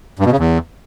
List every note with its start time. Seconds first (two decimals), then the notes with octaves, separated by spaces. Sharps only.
0.19 G2
0.26 B2
0.32 C#3
0.39 E2